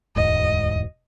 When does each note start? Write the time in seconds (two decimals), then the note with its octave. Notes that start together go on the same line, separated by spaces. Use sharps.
0.16 E1 D2 G#2 D#5